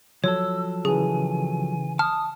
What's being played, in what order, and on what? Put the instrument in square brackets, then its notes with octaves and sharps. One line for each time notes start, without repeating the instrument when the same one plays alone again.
[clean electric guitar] F3 F#3 A4 [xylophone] C#5 [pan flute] E6
[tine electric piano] C#3 E3 [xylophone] G#4 [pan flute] G#5
[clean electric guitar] A5 [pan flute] D#6 [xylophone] F6